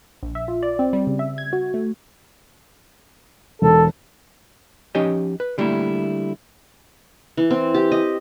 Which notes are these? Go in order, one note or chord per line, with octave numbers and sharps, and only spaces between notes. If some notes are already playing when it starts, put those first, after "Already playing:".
A#1
E5
F4
D5
C4
G3
C#3
E5
G#6
F#4
A3
E1 A4
F3 C#4 D#4 G4 C#5 D#5
B4
D3 G3 A3 A#3 E4
E3
C4
G4
D#5